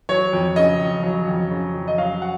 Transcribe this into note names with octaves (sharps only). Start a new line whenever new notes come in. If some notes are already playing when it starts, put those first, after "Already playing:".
F#3 C#5
F2
C#3 D#5
F2
F#3
F2
C#3
F2
D#5
F#3 F5
F#5